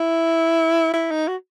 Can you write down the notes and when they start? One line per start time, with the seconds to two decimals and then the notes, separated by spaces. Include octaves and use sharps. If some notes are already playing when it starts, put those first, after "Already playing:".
Already playing: E4
0.94 E4
1.11 D#4
1.28 F#4